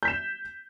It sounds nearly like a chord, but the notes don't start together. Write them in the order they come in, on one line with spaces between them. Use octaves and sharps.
G6 B6 E7